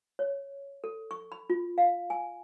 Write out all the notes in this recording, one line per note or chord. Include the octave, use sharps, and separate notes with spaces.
C#5
A4
C#6
B5
F4
F5
G#5